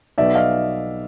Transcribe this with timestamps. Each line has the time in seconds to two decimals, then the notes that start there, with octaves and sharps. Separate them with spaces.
0.18 B1 B2 D5 E5
0.35 D#5 F5